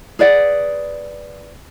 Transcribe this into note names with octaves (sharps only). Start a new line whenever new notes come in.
G#4 B4 D5 F#5